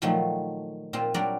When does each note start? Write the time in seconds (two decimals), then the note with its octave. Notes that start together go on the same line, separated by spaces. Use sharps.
0.02 A#2 D#3 F3 F#3 A3
0.93 A#2 C4 F4
1.14 F#3 G3 D4 A#4 D5